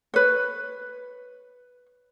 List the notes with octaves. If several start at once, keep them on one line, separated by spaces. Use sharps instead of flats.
B4 C#5